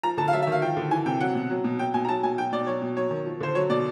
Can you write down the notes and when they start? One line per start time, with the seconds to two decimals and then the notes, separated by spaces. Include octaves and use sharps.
0.03 F3 A#5
0.17 D3 A5
0.28 F5
0.32 F#3 E5
0.42 E5
0.47 D#3 F5
0.62 F3 G5
0.77 D3
0.91 E3 G#5
1.06 C3 G5
1.20 F#3 F#5
1.35 B2
1.50 F#3
1.64 B2
1.79 F#3 G5
1.94 B2 G#5
2.05 A#5
2.09 F#3 A5
2.23 B2 G#5
2.38 F#3 G5
2.52 B2 D5
2.67 F#3 C#5
2.82 B2
2.97 F#3 C#5
3.11 D#3
3.26 F3
3.41 D3 C5
3.55 F#3 C#5
3.70 B2 D5